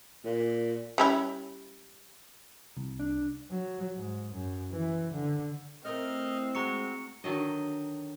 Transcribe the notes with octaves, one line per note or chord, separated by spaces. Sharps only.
A#2
G3 C#4 E4
C2
D4
F#3
G#2
F#2
E3
D3
A3 C4 E4 A#4 D#5 F6
G#3 F#4 A#5 C#6 C#7
D3 D#3 F#3 D#5